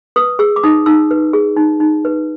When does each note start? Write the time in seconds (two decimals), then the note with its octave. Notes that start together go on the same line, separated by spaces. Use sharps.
0.16 B4 D#6
0.39 G#4 E6
0.56 D6
0.63 D#4 D#6
0.86 D#4 E6
1.11 B4
1.33 G#4
1.57 D#4
1.80 D#4
2.05 B4